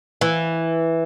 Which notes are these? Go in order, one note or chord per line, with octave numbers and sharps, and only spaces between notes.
E3